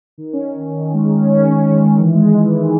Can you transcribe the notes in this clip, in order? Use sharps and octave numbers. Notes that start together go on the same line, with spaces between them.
D#3
C#4
D#3
D#3
D#3
G#3
D#3
C#4
C#4
C#4
D#3
D#3
E3
G#3
E3
E3
E3